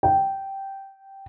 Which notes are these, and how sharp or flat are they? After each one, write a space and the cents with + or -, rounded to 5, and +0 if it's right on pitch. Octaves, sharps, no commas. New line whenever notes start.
G5 -10